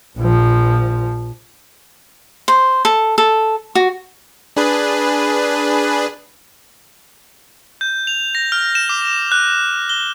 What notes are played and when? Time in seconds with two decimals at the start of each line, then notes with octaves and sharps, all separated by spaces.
0.17 A#1 F3
2.48 C5
2.85 A4
3.18 A4
3.75 F#4
4.56 D4 G#4 B4
7.81 G6
8.07 F7
8.35 A#6
8.52 F6
8.75 E7
8.89 D6
9.32 F#6
9.89 G7